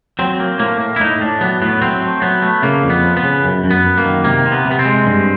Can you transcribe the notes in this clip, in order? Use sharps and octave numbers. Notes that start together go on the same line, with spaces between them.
F#3 C4
A#3
A2 A#3
A#3
E4
A2 D#4
A2 D4
F#3 B3
A2 B3
F#3 C4
A3
F#3 B3
A3
C#3 A#3
F2
B3
F3
B3
C#3
F#2
F#2
B3
F#2
A#3
D#3
C3 A#3
C3
B3
C3
B3
C4
G#3
G2